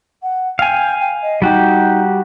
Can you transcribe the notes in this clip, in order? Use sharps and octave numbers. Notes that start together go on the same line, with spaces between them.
F#5
F5 G5 G#5
G5
D#5
G3 D#4 F#4 G4